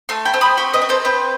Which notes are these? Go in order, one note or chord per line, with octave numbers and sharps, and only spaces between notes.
A3 A5 C6
G5 B5
C4
B5 D#6
F#4 G5 B5
B4 D#5
F#4
A4 C5
C4 B4